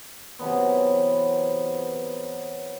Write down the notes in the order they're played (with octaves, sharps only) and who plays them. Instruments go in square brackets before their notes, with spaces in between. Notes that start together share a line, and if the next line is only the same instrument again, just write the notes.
[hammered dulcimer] C3 E3 F#3 B3